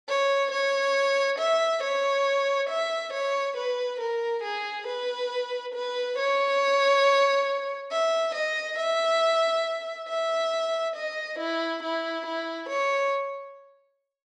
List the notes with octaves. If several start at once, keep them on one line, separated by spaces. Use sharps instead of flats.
C#5
C#5
E5
C#5
E5
C#5
B4
A#4
G#4
B4
B4
C#5
E5
D#5
E5
E5
D#5
E4
E4
E4
C#5